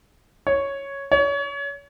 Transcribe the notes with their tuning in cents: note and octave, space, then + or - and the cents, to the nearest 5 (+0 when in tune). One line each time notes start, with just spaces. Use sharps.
C#5 +0
C#5 +30